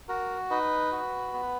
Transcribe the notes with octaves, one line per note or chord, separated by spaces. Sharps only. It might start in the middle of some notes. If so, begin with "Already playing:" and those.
F#4 A#4
D#4 B4
F#4
B3